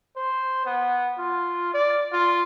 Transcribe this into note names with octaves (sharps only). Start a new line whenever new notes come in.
C5
B3
F4
D5
F4